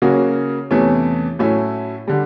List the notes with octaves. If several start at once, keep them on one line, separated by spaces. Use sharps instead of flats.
C#3 F#3 A#3 C#4 F#4
E2 C3 E3 A3 C#4
A2 F#3 A3 C#4 E4
D3 G3